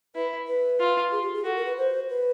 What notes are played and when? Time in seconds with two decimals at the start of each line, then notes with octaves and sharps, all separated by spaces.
0.16 E4 B4
0.47 B4
0.80 F4
1.12 G#4
1.23 G4
1.34 G#4
1.44 F#4 A4
1.56 A#4
1.65 B4
1.77 C5
2.09 B4